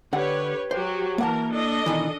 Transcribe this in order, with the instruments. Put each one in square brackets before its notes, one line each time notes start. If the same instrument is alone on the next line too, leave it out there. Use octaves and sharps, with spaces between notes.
[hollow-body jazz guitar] D3 F#5 [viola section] G4 B4 C#5
[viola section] F#3 F#4 G4 [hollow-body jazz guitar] C5
[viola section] E3 A#4 [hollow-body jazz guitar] A#3 F#5 A5
[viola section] D4 A4 D#5
[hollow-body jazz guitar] B2 D#3 E3